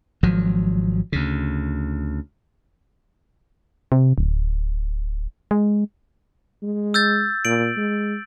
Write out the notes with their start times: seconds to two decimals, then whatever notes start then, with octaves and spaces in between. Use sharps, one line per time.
0.23 G#1 F3 F#3
1.12 D2 C#3
3.92 C3
4.18 D1
5.51 G#3
6.63 G#3
6.94 E6 G6 A6
7.45 A#2 D7 F#7
7.77 G#3